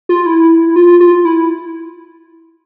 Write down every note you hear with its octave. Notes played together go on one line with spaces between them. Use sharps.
F4
E4
F4
F4
E4